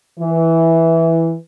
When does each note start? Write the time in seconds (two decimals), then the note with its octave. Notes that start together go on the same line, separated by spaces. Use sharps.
0.20 E3